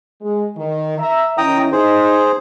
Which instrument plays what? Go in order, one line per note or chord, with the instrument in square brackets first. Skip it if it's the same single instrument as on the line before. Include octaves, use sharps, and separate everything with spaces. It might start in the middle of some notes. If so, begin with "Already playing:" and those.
[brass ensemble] G#3
D#3
E5 A#5
[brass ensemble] D#3 C#4 E4 [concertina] G5 A#5 D#6
[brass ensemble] D#4 [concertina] G#4 C5